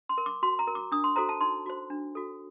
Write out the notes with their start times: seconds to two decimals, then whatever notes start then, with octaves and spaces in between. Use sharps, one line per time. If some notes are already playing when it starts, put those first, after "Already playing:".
0.09 C6
0.18 A#4
0.26 D6
0.43 F#4 C6
0.59 A#5
0.67 A#4
0.75 D6
0.92 D4 D#6
1.04 C6
1.16 F#4 A4 C5 A#5
1.29 A5
1.41 D#4 C6
1.66 F#4 C5
1.90 D4
2.15 F#4 A4